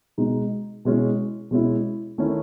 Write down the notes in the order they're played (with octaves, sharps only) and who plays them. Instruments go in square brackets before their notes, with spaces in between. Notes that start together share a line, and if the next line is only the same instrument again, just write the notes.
[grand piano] B2 G#3 D#4
B2 G#3 C#4 E4
B2 G#3 C#4 E4
D#3 A3 C#4 E4